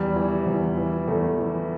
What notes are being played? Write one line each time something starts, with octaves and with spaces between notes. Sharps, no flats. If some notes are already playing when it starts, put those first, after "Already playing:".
Already playing: E2 G3
E3
E2
E3
E2 A3
E3